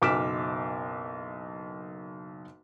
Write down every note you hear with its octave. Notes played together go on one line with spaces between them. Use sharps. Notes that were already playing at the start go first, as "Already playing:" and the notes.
F#1 B1 D6 F6 B6 E7